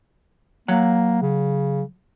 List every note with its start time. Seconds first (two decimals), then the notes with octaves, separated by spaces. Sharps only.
0.68 F#3 A#3 F#5
1.22 C#3